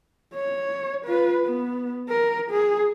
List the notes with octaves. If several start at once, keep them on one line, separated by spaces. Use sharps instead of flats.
C#5
F4 B4
B3
A#4
G#4